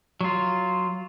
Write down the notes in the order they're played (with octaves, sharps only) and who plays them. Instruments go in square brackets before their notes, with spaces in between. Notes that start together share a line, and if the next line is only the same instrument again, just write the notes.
[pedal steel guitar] F#3 F4